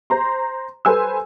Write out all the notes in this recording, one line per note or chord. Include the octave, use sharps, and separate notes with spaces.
C5 A#5 C6
A4 B4 C5 G#5 E6